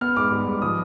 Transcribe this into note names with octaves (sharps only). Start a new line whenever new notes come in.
B3 F6
G#2 D6
G3
G#2
F3 D#6